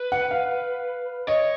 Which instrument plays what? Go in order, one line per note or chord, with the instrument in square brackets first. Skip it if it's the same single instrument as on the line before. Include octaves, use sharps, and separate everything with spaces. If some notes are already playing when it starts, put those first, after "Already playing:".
Already playing: [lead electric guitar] B4
[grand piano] F#5
F5
[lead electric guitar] C#5 [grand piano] D#5